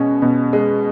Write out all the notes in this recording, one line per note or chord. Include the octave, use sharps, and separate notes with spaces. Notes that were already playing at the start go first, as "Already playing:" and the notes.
Already playing: B2 G#3 C#4
B2
G#3